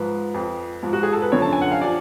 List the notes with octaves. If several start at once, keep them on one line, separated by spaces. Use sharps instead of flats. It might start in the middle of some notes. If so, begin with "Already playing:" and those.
Already playing: G#2 F3 B4
F2 F3
G#2 F3
F#4
G#4
A4
B4
F#2 D3 F3 C#5
A5
G#5
F#5
F5
F3 D5